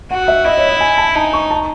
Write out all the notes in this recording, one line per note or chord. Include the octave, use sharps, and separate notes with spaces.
F#4 F#5
E5
E4 D#5
C#5
D#5
G#5
A5
D#4 A5
C#6
A5